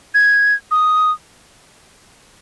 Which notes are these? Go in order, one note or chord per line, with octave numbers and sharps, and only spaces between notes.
G#6
D#6